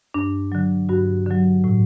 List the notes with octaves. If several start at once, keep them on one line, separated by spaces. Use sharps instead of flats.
G2 D4
D3 F#3
G2 F#4
D3 F#3
A2